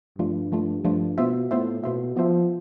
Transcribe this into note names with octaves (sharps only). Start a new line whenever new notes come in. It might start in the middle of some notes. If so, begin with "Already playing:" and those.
G2 F3 A3 D4 F4
F3 A3 D4 F4
G2 F3 A3 D4 F4
B2 B3 F4 C5 E5
A2 B3 F4 C5 E5
B2 B3 F4 C5 E5
F3 B3 F4 C5 E5